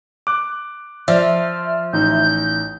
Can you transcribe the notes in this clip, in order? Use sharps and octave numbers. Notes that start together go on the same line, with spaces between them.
D6 F#6
F3 C5 D5 E5 F6
A1 D#4 G6